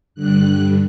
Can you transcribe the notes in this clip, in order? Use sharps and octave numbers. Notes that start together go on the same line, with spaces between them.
G2 D3 G3 F#6